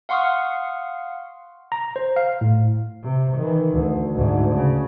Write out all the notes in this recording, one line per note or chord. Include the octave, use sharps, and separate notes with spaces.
F5 F#5 C6 C#6 D#6 F6
A#5
C5
F5
A2
C3
D#3 E3
D2
D2 G#2
C#3